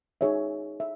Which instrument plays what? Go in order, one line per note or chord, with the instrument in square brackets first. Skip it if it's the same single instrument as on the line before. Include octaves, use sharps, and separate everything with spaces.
[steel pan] D#4 G#4 C#5 E5
E5